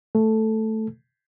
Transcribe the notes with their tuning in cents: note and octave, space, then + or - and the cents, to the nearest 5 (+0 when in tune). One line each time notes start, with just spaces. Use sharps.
A3 +0 A4 -5